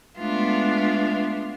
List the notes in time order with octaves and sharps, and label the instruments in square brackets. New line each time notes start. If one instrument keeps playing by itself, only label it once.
[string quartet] G#3 A3 B3 D4 F4 E5